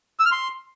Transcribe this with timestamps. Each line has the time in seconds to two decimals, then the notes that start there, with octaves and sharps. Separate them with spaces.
0.20 E6
0.26 F6
0.32 C6